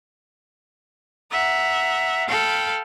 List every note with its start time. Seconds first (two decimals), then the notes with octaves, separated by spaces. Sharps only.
1.31 E5 F#5 A#5
2.28 A4 F5 G5 B5